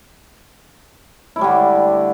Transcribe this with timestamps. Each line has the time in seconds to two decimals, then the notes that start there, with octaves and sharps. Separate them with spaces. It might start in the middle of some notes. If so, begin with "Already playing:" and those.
1.36 E4
1.39 A3
1.41 G3
1.44 D3